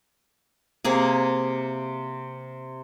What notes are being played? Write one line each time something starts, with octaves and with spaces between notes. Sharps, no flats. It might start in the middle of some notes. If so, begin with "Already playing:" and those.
C3 A#3 G#4